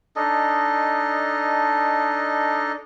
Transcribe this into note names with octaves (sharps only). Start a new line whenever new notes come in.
D4 D#4 A4 D#5